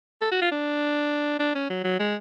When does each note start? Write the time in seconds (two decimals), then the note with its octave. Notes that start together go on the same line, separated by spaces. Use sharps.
0.21 A4
0.31 F#4
0.42 F4
0.51 D4
1.39 D4
1.55 C#4
1.70 F#3
1.84 F#3
2.00 G#3